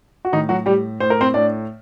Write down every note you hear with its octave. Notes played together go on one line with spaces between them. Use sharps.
F#4
A2 D#3 D#4
F#3 F#4
A2 G3 G4
A2 C5
A#4
C4 C5
A2 D4 D5